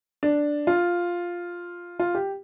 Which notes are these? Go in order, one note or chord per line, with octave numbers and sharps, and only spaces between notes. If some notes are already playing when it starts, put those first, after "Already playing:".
D4
F4
F4
G4